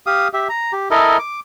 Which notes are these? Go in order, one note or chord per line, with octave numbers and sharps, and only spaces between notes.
G4 F5 D#6
G4 E5
A#5
G4
E4 A4 A#4 D#5
D6